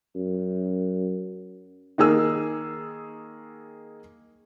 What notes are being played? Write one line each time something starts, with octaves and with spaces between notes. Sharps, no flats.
F#2
D#3 A#3 G#4 E6